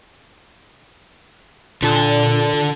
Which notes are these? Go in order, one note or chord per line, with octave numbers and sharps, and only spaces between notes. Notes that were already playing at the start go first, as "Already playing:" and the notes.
A#2 D3 A4